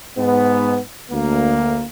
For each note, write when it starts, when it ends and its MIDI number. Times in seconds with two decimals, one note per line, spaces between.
0.18 0.78 44
0.18 0.78 59
1.11 1.83 38
1.11 1.83 58